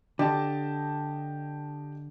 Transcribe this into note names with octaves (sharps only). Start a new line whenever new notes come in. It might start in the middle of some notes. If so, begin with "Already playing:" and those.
D3 G4 D#5 A5